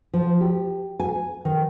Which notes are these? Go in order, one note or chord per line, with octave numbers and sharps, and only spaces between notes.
F3
G4
G#5
D#3